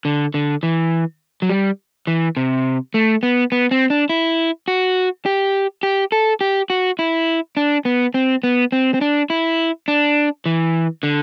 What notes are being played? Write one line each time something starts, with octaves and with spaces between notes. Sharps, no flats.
D3
D3
E3
F#3
G3
E3
C3
A3
B3
B3
C4
D4
E4
F#4
G4
G4
A4
G4
F#4
E4
D4
B3
C4
B3
C4
C4
D4
E4
D4
E3
D3